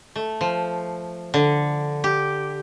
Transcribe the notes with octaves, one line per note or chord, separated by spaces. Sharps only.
A3
F3
D3
G4